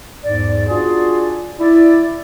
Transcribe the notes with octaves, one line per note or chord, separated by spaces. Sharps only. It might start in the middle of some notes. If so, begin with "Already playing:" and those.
E2 G#2 D5
D4 F4 F#4 G#4 D5
E4 D5